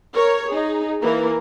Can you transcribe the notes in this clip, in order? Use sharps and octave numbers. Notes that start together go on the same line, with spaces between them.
A#4 C#5
D#4 G#4
E3 A#3 A#4